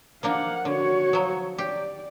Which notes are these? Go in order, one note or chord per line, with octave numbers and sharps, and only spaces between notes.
F3 A#3 D4 F5 F#5
D3 F#4 C#5
F3 F#3
G4 D5